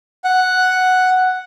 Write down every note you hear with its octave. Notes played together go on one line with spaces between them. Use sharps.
F#5